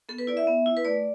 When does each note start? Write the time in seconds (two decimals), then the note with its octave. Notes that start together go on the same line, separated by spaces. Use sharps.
0.09 B3 A4
0.18 B4
0.27 E4 D5
0.37 E5
0.47 B3
0.66 E4
0.77 B4
0.85 A3 D5